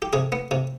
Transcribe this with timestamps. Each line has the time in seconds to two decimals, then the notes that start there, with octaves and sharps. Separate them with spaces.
0.02 G4
0.13 C3 G#4
0.32 B3
0.51 C3